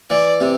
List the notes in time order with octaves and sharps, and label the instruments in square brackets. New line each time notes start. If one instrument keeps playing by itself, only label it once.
[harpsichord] E3 [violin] D5
[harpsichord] C3